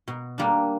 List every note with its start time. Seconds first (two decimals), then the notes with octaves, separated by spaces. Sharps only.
0.08 B2
0.38 G3 A#3 D4